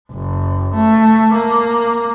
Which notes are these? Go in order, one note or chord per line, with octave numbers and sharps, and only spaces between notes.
F#1
A3
A#3